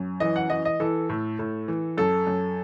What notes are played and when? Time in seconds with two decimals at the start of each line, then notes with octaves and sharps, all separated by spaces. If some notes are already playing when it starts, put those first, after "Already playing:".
Already playing: F#2
0.20 E3 D#5
0.36 F#5
0.50 E3 D#5
0.65 D#5
0.80 E3 A4
1.09 A2
1.39 A2
1.68 E3
1.98 F#2 A4
2.27 F#2